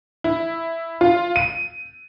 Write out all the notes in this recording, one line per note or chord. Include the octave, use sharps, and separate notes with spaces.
E4
F4
D#7